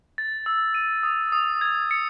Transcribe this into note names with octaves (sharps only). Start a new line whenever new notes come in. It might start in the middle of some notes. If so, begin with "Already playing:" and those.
A6
E6
D#7
D#6
D#6
G#6
C#7